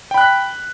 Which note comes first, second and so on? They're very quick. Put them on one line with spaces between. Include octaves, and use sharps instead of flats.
G5 B5 F#6 B6